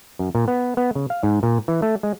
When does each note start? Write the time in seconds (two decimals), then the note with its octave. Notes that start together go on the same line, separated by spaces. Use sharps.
0.19 F#2
0.35 A#2
0.48 B3
0.77 B3
0.95 C#3
1.10 F5
1.23 G#2
1.43 A#2
1.68 E3
1.82 A3
2.03 G#3